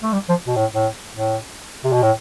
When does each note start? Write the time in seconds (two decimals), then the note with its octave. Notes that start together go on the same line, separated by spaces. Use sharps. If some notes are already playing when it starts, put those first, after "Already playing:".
0.03 A3
0.13 G3
0.29 F3
0.47 B2
0.56 A2
0.74 A2
1.15 A2
1.84 C3
1.93 B2
2.02 A2